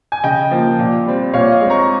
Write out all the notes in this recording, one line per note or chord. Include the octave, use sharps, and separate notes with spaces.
G#5
C#3 D#5 G5
F3 A#3
A#2
G3 C4
A#2 C#5 F5
D#5
G#3 C4
A#5 C#6